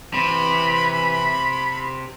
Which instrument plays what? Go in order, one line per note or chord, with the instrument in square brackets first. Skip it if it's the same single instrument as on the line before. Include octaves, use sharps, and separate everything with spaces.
[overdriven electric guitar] C3 [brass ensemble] E3 [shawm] B5